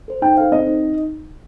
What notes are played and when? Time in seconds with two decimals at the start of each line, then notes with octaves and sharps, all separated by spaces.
0.08 A4 C5
0.22 D#4 G5
0.36 A4 C5 F5
0.52 C4 D#5
0.67 D#4